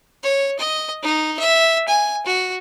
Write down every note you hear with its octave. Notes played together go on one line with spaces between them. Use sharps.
C#5
D#5
D#4
E5
G#5
F#4